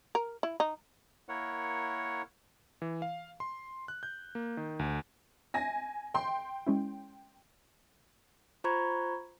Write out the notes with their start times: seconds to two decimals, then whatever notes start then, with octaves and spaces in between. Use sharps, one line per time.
0.15 A#4
0.43 E4
0.60 D#4
1.29 A#3 E4 A#4 C#5 F#5
2.82 E3
3.02 F5
3.40 C6
3.88 F#6
4.03 G6
4.35 A#3
4.57 D#3
4.79 D2
5.54 G#5 A#6
6.14 G5 C6
6.67 G#3 C#4 E4
8.64 F4 C5 A#5 B5 C#6 G#6